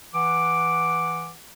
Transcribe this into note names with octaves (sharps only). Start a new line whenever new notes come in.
E3 F#5 D6